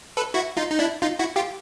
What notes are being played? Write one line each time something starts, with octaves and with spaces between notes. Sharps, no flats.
A4 B4
E4 F#4
D#4 F4
D#4
D4 E4
D#4 F4
E4 F#4
F4 G4